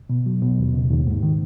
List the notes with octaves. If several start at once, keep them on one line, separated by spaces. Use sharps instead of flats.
B2
F#3
B2
D#2
C#3
D#2
G#2
D#3